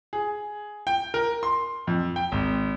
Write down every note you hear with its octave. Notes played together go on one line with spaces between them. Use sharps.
G#4
G5
A#4
C6
F2
G5
G#1